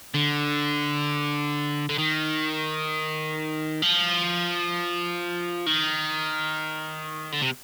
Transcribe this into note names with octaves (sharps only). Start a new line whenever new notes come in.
D3
D3
D#3
F3
D#3
D3
C3